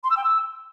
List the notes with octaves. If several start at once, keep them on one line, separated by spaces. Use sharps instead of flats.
C6
E6
G5
E6